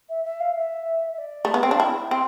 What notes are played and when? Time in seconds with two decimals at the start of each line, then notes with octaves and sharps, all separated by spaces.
0.09 E5
0.24 E5
0.40 F5
0.55 E5
1.13 E5
1.18 D5
1.45 A3
1.54 B3
1.63 C4
1.71 D4 F5
1.80 E4 G5
2.11 C4